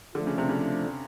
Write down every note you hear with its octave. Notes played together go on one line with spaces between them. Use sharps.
D3 F3 A3 D4
C#3
C3
C#3